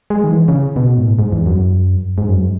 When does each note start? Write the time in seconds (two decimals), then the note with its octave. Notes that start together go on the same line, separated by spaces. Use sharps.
0.10 G#3
0.24 D#3
0.30 E3
0.48 C#3
0.76 B2
0.98 G#2
1.05 A2
1.19 G#2
1.32 E2
1.46 F#2
2.18 G#2
2.29 F#2